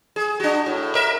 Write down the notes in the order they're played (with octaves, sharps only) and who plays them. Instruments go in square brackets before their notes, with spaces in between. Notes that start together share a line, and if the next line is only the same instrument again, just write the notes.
[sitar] G#4
D4 F#4
A2
A#4 E5